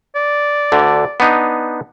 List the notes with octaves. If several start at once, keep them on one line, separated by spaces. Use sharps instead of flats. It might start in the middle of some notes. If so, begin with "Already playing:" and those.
D5
D2 D3
B3 D4 D#4